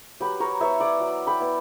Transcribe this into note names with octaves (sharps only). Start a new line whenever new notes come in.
F#3 G4 B4
A#4 C#5
B3 E4 C#5 E5
D5 F#5
F#3
G5 B5
B3 E4